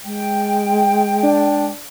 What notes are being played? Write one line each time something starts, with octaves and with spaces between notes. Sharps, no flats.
G#3 G5
D4